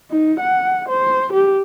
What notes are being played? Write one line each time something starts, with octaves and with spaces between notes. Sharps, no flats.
D#4
F#5
C5
G4